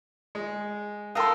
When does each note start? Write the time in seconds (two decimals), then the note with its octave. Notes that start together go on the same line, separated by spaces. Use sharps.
0.35 G#3
1.15 A4 A#4 F5 G5 C6 D#6